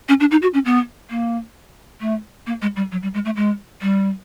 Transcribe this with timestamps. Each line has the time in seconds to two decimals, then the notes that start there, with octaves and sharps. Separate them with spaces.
0.09 C#4
0.20 D4
0.31 D#4
0.42 F#4
0.54 C#4
0.65 B3
1.10 A#3
2.01 A3
2.47 A#3
2.62 G#3
2.76 G3
2.92 F#3
3.03 G3
3.14 G#3
3.25 A3
3.36 G#3
3.82 G3